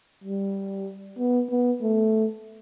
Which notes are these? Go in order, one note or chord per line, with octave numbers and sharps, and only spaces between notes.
G3
B3
B3
A3